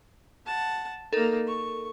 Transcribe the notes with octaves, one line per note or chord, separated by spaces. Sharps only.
F#5 A5
A#3 D#4 A4 A#4
C#6